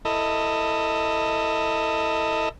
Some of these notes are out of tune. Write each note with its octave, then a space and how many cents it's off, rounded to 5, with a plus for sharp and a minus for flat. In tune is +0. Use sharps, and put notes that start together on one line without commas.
E4 +0 A4 +25 D#5 +0